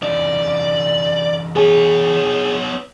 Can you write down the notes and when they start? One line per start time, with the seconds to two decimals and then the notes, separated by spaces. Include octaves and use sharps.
0.02 E3 C#4 D#4 D5
1.56 B3 G#4 C#5 G#5